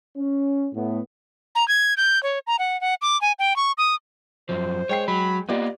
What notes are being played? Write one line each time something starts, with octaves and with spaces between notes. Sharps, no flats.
C#4
A2 A3 B3
A#5
G#6
G6
C#5
A#5
F#5
F#5
D6
G#5
G5
C#6
D#6
F#2 F3 C5
G#3 C#5 G5 C7
F#3 B5
A#3 B3 F4 G4 D5 D#5